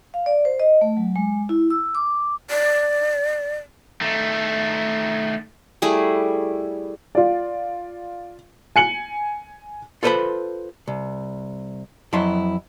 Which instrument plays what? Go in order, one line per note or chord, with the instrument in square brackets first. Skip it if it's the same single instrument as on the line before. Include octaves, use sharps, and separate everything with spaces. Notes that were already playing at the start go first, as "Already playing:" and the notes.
[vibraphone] F5
D5
C5
D#5
A3
F#3
G#3
E4
E6
D6
[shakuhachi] D5
[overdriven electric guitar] D#3 A3
[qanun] G3 A3 E4 G#4
[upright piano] F4 D5
G#5 C#7 F#7
[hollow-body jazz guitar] F4 A4 B4 C5 A5 B5
C2
F2 F#3 E4 A5 C6